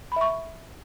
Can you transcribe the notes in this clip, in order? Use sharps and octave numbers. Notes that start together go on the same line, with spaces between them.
E5 B5 C#6